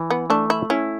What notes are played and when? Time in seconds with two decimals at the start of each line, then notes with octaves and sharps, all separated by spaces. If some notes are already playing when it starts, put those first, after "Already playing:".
Already playing: E3
0.10 B3
0.30 A3 D4
0.50 E4
0.70 C#4 E4